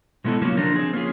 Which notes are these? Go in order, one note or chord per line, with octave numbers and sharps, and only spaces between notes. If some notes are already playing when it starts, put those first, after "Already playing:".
B2 G#3 A3 B3 E4 A4
C#3 F3 F#3 A#3 C#4
D3 F3 D4 A#4
C4 G#4
A#3 C#4 F4 G#4